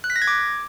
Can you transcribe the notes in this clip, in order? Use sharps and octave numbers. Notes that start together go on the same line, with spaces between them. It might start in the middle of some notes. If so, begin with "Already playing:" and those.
F#6
B6
A#6
G#6
D6